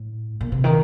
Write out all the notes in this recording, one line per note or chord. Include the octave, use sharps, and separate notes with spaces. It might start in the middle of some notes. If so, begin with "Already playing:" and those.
Already playing: A2
A#2
C3
D#3